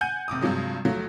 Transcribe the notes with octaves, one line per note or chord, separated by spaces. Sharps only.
F#5 G#5 G6 D#7
F#1 C3 D6 D#6
G2 C3 F3 F#3 G#3
G1 F3 F#3 A3